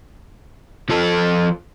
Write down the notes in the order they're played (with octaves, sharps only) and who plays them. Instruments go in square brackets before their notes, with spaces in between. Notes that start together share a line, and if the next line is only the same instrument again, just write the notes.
[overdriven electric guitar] F3 A4